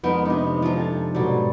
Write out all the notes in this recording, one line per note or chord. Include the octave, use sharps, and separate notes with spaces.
F2 G#3 A3 B3 D#4 A#4
C3 B3 D4 D#4
F3 A#5
A4 G#5 A5
G#2 B2 F#3 G3 A4